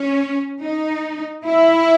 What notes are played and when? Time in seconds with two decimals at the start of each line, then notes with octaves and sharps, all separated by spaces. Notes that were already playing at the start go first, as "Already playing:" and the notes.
Already playing: C#4
0.61 D#4
1.45 E4